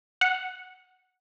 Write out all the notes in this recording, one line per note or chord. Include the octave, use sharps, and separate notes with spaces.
F#5